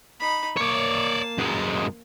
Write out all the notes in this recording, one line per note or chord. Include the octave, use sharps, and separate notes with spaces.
D#4 B5
A#3 C#5 D5 A5
F#2 G#3